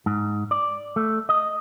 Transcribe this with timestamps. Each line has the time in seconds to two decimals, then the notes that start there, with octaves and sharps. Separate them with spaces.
0.06 G#2
0.51 D5
0.96 A3
1.29 D#5